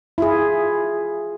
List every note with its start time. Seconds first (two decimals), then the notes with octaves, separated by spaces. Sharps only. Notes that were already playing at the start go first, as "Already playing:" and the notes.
0.18 E4 F4 G#4